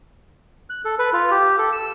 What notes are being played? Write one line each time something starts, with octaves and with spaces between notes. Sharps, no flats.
F#6
A4
B4
F4
G4
A4
E6